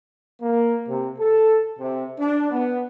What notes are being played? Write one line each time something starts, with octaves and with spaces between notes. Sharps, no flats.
A#3
C3
A4
C3
D4
B3